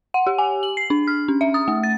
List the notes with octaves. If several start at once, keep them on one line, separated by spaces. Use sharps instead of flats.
F#5
G4
G#5
F#7
C7
D4
F6
C#4
E5
D#6
A3
A6